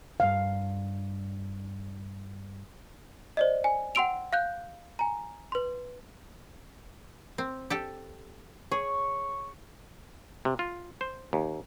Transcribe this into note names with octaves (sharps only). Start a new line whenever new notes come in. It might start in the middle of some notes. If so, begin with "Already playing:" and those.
E2 G2 F5
C5 D5 D#5
G#5
F#5 G5 C6 E6 D7 F7
F5 F#6 G6
G#5 A#5
B4 C6
C4
G4 A4 G5
G#4 C#5
C3
F4
C5
D#2